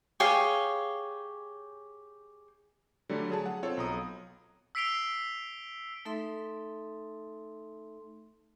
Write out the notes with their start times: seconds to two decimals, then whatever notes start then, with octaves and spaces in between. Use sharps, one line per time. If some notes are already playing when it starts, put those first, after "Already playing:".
0.20 G4 G#4 C#5 F5
3.09 D3 F#3 G3 A3
3.30 F#3 G#4 A5
3.46 F#5
3.63 C4 F4 A4 C#5
3.77 B1 A#5 D#6
4.75 E6 B6 C7 D7 F7 G7
6.05 A3 D#4 A4 E5 C6